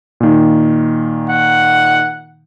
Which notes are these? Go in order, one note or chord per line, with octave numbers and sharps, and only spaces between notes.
A#2 D#3
F#5